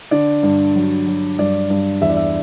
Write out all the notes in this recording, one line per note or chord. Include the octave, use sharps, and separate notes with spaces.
D3 D5
G2
F#3
F#3
G2 D5
G2
E2 E5
D5
E5